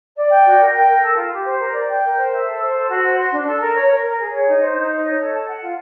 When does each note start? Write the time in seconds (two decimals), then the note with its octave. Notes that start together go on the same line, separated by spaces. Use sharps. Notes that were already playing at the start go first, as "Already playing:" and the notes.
0.15 D5
0.29 G5
0.45 F#4
0.58 A#4
0.72 G5
0.87 A#4
1.01 A4
1.15 F4
1.31 G4
1.44 C5
1.58 A#4
1.73 D5
1.88 G5
2.03 A#4
2.17 C5
2.30 E5
2.45 A4
2.59 C5
2.74 A4
2.88 F#4
3.02 C5
3.17 C6
3.31 D4
3.46 A4
3.61 A#4
3.74 C#5
3.89 A#4
4.03 A#4
4.18 G#4
4.31 C#5
4.46 D#4
4.61 C5
4.75 D#4
4.89 D#5
5.04 C#5
5.18 A4
5.32 A5
5.46 F#5
5.61 F4